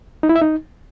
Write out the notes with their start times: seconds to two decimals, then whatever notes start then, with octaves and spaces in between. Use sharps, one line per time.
0.23 D#4
0.29 E4
0.36 E5
0.42 D#4